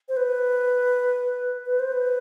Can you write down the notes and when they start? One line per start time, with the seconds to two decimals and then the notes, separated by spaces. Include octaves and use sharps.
0.09 C5
0.16 B4
1.66 B4
1.79 C5
1.92 B4